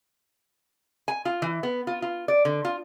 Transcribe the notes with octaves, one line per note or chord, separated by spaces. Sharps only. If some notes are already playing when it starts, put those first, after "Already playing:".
G#5
F4
E3
B3
F4
F4
D5
D3
F4